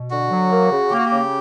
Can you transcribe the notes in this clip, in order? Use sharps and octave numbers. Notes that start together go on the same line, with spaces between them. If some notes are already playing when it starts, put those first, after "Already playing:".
Already playing: B2
D3 F#4
F#3
A#3
C#3
A#3 G4
F#4
G4
C#3